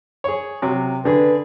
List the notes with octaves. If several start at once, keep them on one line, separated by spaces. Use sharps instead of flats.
G#4 C#5
C3 F#3
D3 G#4 B4